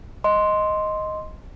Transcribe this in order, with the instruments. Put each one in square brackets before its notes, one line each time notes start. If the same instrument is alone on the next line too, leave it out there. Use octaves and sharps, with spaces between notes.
[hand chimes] D#5 C6